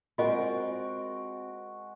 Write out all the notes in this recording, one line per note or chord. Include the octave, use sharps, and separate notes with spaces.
G#3 C4 F4 F#4 A#4 C5 D#5